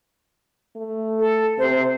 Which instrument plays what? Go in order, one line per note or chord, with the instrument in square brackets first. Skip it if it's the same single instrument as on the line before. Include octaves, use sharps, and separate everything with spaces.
[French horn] A3
[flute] A4
[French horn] C3 [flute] C5